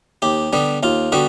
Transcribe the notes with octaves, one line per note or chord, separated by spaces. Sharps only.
D#2 G4
D3 G3 B3
D#2 F4
D3 G3 B3 F#4